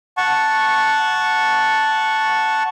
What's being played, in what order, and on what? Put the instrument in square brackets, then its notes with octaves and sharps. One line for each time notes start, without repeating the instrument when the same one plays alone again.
[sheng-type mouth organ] F#5 A5 C#6